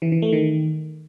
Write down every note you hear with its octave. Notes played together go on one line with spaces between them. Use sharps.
E3
E3
A3
D#3